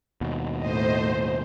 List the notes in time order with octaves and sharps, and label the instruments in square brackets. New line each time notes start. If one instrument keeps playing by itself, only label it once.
[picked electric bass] D#2 B2
[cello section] A2 D#5 [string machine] C5